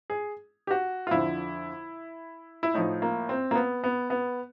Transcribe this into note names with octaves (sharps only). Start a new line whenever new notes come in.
G#4
G4
F#4
F4
F2 D3 F3 E4
E4
A2 F3 D#4
A#3
C4
A#3
B3
B3
B3